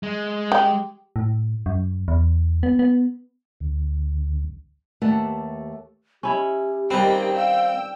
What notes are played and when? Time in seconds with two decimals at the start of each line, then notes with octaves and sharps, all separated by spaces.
0.03 G#3
0.52 G4
1.16 A2
1.66 F#2
2.08 E2
2.63 B3
2.79 B3
3.60 D2
5.02 D#2 A3 G4 B4 F#5 A5
6.23 C#4 E4 G4
6.91 D#3 G3 A#3 C4 B4 G5
7.35 F5 G5 E6